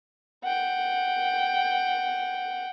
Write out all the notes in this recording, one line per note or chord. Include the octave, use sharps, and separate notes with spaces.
F#5 G5